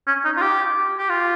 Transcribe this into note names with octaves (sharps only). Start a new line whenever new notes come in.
C#4
D#4
F4
G4
G4
F4